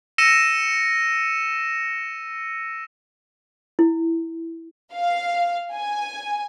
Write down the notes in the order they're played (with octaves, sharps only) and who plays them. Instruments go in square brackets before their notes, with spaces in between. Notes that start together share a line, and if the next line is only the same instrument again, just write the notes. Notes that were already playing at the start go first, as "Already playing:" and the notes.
[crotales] E6 A#6 C#7 D#7 E7
[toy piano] E4
[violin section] F5
G#5